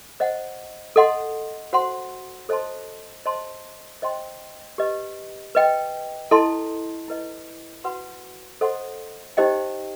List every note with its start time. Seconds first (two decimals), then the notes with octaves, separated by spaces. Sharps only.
0.20 C5 D#5 F#5
0.96 A4 D#5 F#5 C6
1.73 F#4 C5 F#5 C6
2.49 A4 C5 D#5 A5 C6
3.26 C5 D#5 A5 C6
4.02 C5 D#5 G5 C6
4.78 G4 B4 D#5
5.55 B4 D#5 G5
6.31 E4 A4 D#5 A5 C6
7.08 E4 B4 D#5
7.84 F#4 B4 F#5 C6
8.61 A4 C5 D#5 F#5 C6
9.37 D#4 G4 C5 D#5 G5